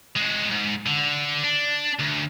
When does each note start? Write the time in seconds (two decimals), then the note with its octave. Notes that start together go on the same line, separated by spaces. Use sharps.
0.16 G#3 F#4
0.51 G#2
0.86 D3
1.44 D4
1.99 D2